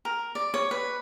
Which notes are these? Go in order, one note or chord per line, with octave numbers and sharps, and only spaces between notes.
A#4
D5
C#5
B4